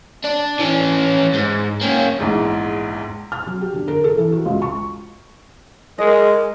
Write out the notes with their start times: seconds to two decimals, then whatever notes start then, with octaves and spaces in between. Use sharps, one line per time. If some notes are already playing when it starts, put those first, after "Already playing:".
0.24 D4
0.59 E3 C#4
1.33 G#2
1.81 A#3 C#4
2.18 A#1 E2 G#2
3.32 F6
3.47 F#3
3.61 G4
3.74 D3
3.88 A#4
4.04 A4
4.18 E3
4.32 F#4
4.46 C#2
4.62 C#6
5.98 G#3 A#4 D#5